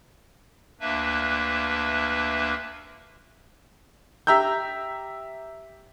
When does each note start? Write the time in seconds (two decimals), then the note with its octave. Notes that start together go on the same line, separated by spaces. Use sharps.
0.80 D2 A#3 D4 B4 E5
4.27 G4 E5 A#5 E6 G6